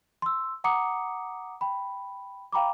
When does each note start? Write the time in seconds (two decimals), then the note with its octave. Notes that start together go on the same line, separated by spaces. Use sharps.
0.22 C6 E6
0.64 F#5 A#5 D6 D#6 C#7
1.61 G5 B5
2.52 F5 G5 A#5 B5 D6